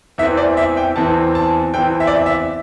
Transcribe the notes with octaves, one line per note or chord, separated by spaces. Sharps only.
E2 E3 C4 E5
D5
E5
G5
E2 E3 C4 A5
A5
E2 E3 C4 G5
E5
D5
E5
E5